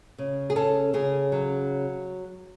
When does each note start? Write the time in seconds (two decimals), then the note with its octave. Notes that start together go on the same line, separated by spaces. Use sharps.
0.18 C#3
0.50 G#4
0.56 C#4 A4
0.93 C#3 G#4
1.32 F#3